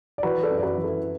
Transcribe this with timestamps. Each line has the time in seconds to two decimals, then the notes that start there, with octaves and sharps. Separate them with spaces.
0.18 D5
0.23 E3 F#4 B4
0.43 A4 D5
0.51 F#2
0.58 D5
0.63 F#4 B4
0.78 E3
0.83 E4 A4